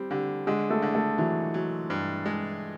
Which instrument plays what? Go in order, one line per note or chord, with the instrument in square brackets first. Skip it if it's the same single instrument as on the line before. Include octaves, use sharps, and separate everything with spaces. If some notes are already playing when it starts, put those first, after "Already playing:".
Already playing: [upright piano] G3 [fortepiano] C4
[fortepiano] D3 [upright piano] G3
[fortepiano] D3 [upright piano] G#3
[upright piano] A3
[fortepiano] D3
[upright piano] A3
[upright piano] E3 [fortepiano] F#3
[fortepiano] F#3
G2
G#3